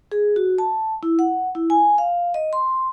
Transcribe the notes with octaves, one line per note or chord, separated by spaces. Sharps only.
G#4
F#4
A5
E4
F#5
E4
G#5
F5
D#5
C6